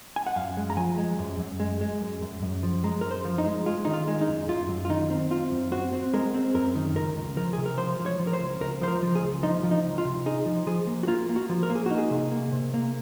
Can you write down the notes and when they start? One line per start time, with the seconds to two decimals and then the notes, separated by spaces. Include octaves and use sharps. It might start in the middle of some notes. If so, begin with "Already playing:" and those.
0.16 G#5
0.27 F#5
0.36 F#2 F5
0.57 G#3
0.70 A#5
0.77 F3 G#5
0.98 G#3
1.19 F#2
1.39 F#2
1.60 G#3
1.81 G#3
2.01 F#2
2.22 F#2
2.43 F#2
2.63 F3
2.84 G#3 A#5
3.01 F#2 A#4
3.11 C5
3.25 F3
3.38 D#4
3.45 G#3
3.66 G#3 F4
3.85 D#3 D#4
3.93 F4
4.08 G#3
4.21 D#4
4.28 F#2
4.48 F#2 F4
4.69 F#2
4.85 F4
4.90 D#3 D#4
5.10 C4
5.31 C4 F4
5.51 F#2
5.72 C4 F#4
5.93 C4
6.14 G#3 A#4
6.35 C4
6.54 F#2 A#4
6.75 D#3
6.96 C#2 A#4
7.16 C#2
7.36 F3 A#4
7.53 C3 G#4
7.66 A#4
7.78 F3 C5
7.99 F3
8.06 C#5
8.19 F3
8.27 A#4
8.33 C5
8.40 C#2
8.61 C#2 A#4
8.81 F3 C5
8.88 A#4
9.03 F3
9.16 G#4
9.22 C#2
9.43 F3 D#4
9.63 F3
9.71 D#4
9.85 C#2
9.98 F4
10.05 C3
10.26 D#4 G#4
10.46 F3
10.67 F3 G#4
10.87 A#3
11.03 F#4
11.07 A#3 F4
11.29 A#3
11.36 F#4
11.49 F3
11.63 A#4
11.70 A#3
11.75 G#4
11.86 D#4 F#4
11.98 G#4
12.11 C3
12.32 A#3
12.52 C3
12.74 A#3